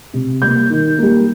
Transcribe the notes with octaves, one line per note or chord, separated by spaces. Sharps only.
C3
G3 A#3 G6
D#3
G3 A#3